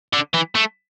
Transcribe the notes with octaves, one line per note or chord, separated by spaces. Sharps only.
D3
E3
A3